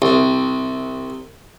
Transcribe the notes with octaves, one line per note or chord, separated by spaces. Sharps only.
C2